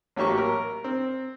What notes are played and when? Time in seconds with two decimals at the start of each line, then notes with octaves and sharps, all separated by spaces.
0.16 A1 F#3 A#3 G4 C#6
0.38 A#4
0.84 C4